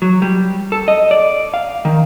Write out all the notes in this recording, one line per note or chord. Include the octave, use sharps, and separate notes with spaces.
F#3
G3
A4
D#5
D5
F5
D#3